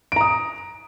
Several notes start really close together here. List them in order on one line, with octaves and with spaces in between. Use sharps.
D7 A#5 D#6